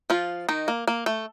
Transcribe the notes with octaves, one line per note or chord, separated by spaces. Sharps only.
F3 F4
D#3 D#4
A#3
A#3
A3